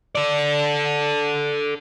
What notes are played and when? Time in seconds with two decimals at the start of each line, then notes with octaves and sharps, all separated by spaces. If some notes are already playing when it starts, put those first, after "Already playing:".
0.15 A4 D5